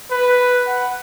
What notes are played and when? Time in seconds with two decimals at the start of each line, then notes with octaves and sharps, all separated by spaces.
0.11 B4
0.67 F#5